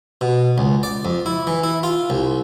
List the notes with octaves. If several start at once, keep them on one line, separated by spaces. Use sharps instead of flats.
B2
C#2
D5
F2
E4
E3
E4
F4
C2